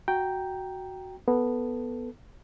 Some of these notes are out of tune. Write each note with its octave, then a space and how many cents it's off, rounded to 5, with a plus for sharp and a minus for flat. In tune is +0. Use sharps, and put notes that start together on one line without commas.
F#4 +0 G5 +0 A#5 +0
B3 +0 A4 +0